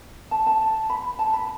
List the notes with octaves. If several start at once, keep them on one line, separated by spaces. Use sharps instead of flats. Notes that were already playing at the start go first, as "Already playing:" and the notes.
A5
A5
B5
A5
B5